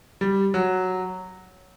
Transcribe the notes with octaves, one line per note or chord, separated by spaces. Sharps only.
G3
F#3